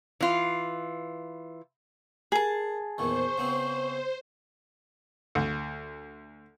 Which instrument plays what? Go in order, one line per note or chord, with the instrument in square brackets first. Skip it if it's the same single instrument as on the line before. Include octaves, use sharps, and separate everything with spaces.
[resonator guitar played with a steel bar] E3 F4
[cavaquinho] G#4 A5 [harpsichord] A#4
[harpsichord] E2 A#2 D#3 [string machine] C5 [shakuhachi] C#6
[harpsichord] C#3 B3 C4
[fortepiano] D2